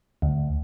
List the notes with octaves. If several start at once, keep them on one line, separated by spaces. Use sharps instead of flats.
D2